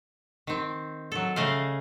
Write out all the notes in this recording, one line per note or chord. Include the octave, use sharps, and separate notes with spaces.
D#3 C4
F#3 A4
C#3 A3 D#5 F5